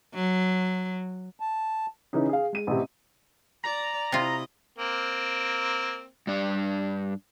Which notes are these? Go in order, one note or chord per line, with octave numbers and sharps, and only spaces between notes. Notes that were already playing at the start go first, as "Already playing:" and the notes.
F#3
A5
C#3 E3 C#4 D#4
G#4 F5
G#3 D#7
A1 C3
D5 A#5
C3 E4 F4 D#5
A#3 C4
G2 D4